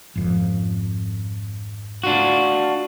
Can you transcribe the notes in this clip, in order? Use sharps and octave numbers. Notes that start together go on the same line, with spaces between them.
G#1 F2
D4 F4 F#4